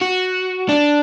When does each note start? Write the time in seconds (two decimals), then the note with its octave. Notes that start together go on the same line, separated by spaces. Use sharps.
0.02 F#4
0.69 D4